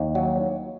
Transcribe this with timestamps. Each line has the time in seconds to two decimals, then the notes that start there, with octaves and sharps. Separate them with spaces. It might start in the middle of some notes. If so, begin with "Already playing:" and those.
Already playing: D#2
0.15 F#3